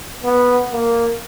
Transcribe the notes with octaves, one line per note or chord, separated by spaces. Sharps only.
B3
A#3